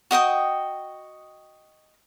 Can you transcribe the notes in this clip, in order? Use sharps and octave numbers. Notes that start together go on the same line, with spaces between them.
F#4 D#5 G5 D#6